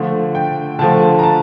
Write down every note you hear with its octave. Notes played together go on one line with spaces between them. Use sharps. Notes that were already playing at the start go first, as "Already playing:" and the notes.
Already playing: D3 F3 A3
G5
D3 F3 A3 A5
A#5
A5